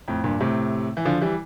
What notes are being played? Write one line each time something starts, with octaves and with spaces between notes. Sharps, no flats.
F2 A2
G2 A#2
A2 C3
E3
D3 F3
E3 G3